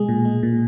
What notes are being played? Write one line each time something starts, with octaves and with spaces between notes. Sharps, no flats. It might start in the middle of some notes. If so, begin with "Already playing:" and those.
Already playing: B2 G#3 G#4
A#2
G#3
A#2